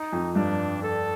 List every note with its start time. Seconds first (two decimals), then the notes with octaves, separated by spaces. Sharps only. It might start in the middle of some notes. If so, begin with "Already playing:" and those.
Already playing: D#4
0.12 F2
0.35 G2 D4
0.83 A4